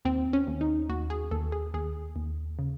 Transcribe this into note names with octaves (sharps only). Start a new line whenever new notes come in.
D#2 C4
C#4
D#2
D#4
D#2 F#4
G#4
D#2 A4
G#4
D#2 G#4
D#2
C#3